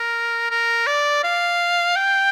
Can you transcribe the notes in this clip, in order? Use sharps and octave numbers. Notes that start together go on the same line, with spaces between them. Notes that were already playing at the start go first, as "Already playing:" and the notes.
Already playing: A#4
A#4
D5
F5
G5